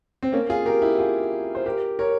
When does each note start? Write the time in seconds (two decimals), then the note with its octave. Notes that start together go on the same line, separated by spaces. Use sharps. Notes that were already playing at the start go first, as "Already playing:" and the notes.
0.23 C4
0.32 A#3 C#4
0.50 F4 G#4
0.65 G4 A#4
0.82 E4 G4
0.99 F4 G#4
1.55 C5
1.66 G4 A#4
1.99 A#4 C#5